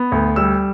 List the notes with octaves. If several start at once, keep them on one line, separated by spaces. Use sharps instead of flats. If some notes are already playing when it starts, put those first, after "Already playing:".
Already playing: B3
D2
G3 E6